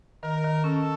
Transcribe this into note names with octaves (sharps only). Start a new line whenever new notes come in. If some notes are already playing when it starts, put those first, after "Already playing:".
D#3 A#4
D#3
C#4 A4